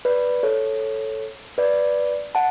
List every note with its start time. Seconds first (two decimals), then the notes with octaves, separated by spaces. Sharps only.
0.05 B4 D5
0.43 A4 C#5
1.58 B4 D5
2.35 F#5 A5